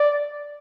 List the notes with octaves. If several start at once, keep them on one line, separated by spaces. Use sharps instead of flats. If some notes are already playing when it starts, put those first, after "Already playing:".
Already playing: D5